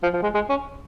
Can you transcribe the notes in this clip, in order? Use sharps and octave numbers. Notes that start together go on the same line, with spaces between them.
F3
F3
G#3
G#3
C#4